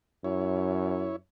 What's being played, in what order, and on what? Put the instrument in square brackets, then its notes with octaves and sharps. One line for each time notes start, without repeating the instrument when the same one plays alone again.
[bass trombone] F#2 [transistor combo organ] E4 C#5